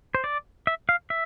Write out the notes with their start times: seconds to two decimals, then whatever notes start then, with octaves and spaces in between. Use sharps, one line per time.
0.15 C5
0.24 D5
0.67 E5
0.89 F5
1.10 E5